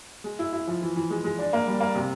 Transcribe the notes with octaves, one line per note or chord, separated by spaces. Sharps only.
G#3
E4
E4
F3
E3
E3
G#3
G#3
D4
A#3
G3
A#3
C3